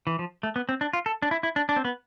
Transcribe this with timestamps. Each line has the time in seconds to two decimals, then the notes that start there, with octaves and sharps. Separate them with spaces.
0.07 E3
0.19 F3
0.43 A3
0.56 B3
0.69 C4
0.81 D4
0.93 F4
1.06 A4
1.22 D4
1.31 E4
1.43 E4
1.56 D4
1.69 D4
1.76 C4
1.85 B3